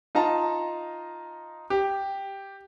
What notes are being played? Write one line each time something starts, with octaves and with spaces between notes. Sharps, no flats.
D#4 F4 A5 A#5
G4